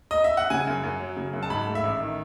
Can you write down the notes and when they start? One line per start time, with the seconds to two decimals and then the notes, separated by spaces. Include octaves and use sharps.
0.11 D#5
0.24 E5
0.37 F#5
0.50 C#3 G#5
0.67 F#2
0.83 F#2
1.00 F#3
1.17 C#3
1.33 F#2
1.43 A5
1.50 G#2 B5
1.67 A3
1.75 E5
1.83 A1
2.00 D#3